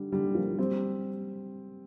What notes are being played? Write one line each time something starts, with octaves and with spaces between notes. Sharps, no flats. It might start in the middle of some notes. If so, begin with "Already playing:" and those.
Already playing: D3 G3
D3 G3
F3 A#3
G3 C4